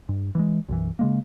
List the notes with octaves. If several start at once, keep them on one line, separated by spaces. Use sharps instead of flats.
G2
E3 G3 G#3
B1 F#2 E3
C#3 G#3 A#3